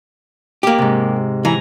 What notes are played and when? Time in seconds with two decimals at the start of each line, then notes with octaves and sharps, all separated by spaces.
0.63 A#3 G4
0.78 G#2 C3
1.45 E3 G#5 A#5